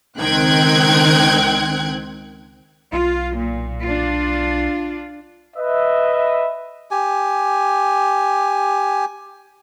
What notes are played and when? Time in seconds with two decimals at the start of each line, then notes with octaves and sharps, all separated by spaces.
0.17 C#2 D#3 C4 G5 F#6 G#6
2.93 B1 F4
3.36 A#2
3.83 D4 F4
5.56 B4 D#5 E5
6.91 G4 G#5